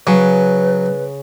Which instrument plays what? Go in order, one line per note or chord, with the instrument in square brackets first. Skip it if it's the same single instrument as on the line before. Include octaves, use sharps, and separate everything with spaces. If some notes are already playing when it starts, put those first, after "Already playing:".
[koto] C#3 [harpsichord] F#3 [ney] B4